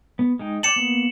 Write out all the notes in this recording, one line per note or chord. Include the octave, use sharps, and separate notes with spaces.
B3
G#3 D#4 G5
D5 G5 A5 C#7 E7 F#7
A#3 B3